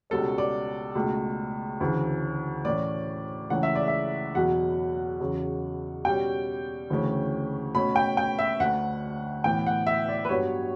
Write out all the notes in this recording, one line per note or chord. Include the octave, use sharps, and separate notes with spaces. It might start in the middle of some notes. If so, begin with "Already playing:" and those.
C#2 B2 G3 C#4 A4
D5
C#2 B2 A3
D2 C#3 E3
A2 E3 A3 C#4 D5
C#2 C#3 E3 A3 C#4 F#5
E5
D5
E5
E2 B2 F#3 F#5
E2 C#3 F#3 C#4
B2 G3 C#4 G5
D2 C#3 E3 A3 C#4
B2 A3 C#4 B5
G5
G5
E5
D2 D3 A3 F#5
A2 E3 B3 G5
F#5
E5
D5
B4
G2 F#3 B3 C#5